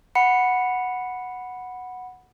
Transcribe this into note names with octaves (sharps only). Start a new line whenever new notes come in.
F#5 B5 C7 C#7